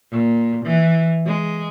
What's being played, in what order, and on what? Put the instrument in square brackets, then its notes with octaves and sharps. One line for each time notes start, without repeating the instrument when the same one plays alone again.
[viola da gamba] A#2
E3
G#3